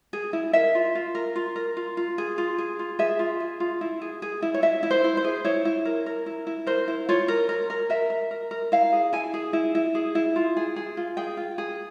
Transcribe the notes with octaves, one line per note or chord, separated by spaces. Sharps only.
G#4
E4
A#4 E5
F4
F4
A#4
F4
A#4
F4
F4
G#4
F4
G#4
F4
G#4 E5
F4
G#4
F4
E4
G#4
G#4
E4
C#5
E4 E5
E4
C5
E4
C5
G#4
E4 C#5
E4
A#4
A#4
E4
E4
A#4 C5
E4
F4 C#5
A#4
A#4
A#4
A#4 E5
A#4
A#4
A#4
E4 F5
G#4
E4 G#5
G#4
E4
E4
G#4
E4
F4
G#4
G#4
F4
G#4 G5
F4
G#4